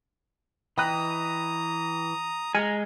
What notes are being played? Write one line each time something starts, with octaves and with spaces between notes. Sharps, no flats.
E3 D#5 G5 A#5 B5 D#6 F#6
G#3 G#5 A#5 F6 G#6 C#7